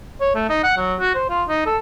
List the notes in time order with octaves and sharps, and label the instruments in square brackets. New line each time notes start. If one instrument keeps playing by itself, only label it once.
[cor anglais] C#5
A3
D#4
F#5
F#3
F#4
C5
F4
D#4
A4